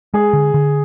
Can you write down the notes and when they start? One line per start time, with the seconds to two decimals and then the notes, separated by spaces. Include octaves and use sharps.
0.14 G#3 G#4
0.33 D3
0.54 D3